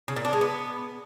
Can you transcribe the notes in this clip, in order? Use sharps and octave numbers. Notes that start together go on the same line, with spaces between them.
C#3
A#2
D4
G#3
B3